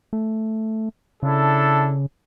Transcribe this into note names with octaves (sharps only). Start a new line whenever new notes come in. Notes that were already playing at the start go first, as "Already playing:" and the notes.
A3
C#3 D4 E4 A4